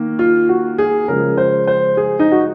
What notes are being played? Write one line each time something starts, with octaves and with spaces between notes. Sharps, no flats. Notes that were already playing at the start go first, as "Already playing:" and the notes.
Already playing: D#3 A#3
F4
F#4
G#4
C#3 F3 G#3 A#4
C5
C5
G#4
D#4
F#4